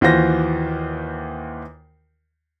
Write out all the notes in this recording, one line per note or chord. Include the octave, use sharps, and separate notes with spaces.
D#2 E3 F4 F#4 C5 A#6